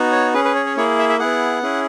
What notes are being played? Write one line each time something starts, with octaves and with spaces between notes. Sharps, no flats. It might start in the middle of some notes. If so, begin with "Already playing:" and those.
Already playing: B3 D#4 F#4
C#5
C#4 G#4 B4
B4
C#5
C#5
A#3 E4 G#4 C#5
E5
E5
B3 E4 G#4 F#5
C#4 E4 G#4